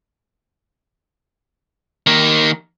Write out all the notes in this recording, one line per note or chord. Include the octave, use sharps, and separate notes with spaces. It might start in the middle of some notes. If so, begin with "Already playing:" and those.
D#3 A#3